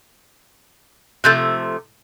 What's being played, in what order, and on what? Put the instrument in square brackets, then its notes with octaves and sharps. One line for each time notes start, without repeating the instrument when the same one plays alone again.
[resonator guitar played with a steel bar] C3 F3 A3 [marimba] F#6 G6 A6